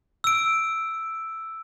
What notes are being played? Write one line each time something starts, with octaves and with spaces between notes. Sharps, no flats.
E6 D7